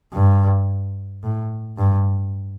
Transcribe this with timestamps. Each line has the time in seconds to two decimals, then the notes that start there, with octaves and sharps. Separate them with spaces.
0.13 G2
1.23 A2
1.78 G2